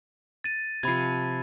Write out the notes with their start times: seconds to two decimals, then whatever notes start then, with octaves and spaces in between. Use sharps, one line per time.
0.44 A6 D#7
0.83 C3 F3 B5 G#6